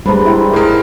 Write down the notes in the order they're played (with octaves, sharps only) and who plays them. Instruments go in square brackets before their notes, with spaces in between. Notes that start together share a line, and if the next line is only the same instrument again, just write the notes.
[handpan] G3 G#3 [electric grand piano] D4 [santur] B4 C5 A#5
[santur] E4 G5
[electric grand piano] G#2 G#3 [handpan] A#4